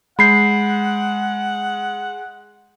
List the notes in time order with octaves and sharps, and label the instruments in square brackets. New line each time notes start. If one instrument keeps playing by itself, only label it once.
[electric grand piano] G#3 G6 [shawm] F#5 [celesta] B5 C7